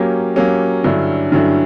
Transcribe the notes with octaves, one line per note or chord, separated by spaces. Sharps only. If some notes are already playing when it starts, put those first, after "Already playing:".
Already playing: F#3 A#3 C#4 G4
F#3 A#3 C#4 G4
G2 D3 F#3 C#4 E4
G2 D3 F#3 C#4 E4